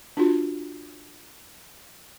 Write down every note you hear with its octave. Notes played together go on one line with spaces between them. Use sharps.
D4 F4 F#4